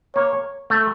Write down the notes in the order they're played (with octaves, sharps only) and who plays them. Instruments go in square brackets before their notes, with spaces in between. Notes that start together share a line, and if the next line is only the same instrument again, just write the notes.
[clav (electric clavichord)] A#3 [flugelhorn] C#5
[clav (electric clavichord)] A3